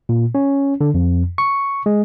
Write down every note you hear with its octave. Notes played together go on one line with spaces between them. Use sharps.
A#2
C#4
D3
F2
C#6
G#3